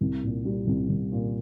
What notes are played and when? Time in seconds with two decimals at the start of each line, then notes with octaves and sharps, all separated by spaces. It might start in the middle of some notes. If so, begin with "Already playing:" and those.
0.01 C2
0.23 A#2
0.45 G3
0.67 C2
0.89 C2
1.12 A#2